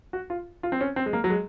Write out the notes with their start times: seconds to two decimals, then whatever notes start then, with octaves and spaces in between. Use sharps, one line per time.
0.13 F#4
0.30 F4
0.63 F4
0.72 C4
0.81 C#4
0.96 C4
1.06 G#3
1.13 A#3
1.24 F#3
1.30 G#3